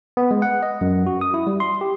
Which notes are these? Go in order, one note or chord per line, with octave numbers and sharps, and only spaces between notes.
B3
G#3
F#5
D#5
F#2
F#4
D#6
E4
G3
C6
G4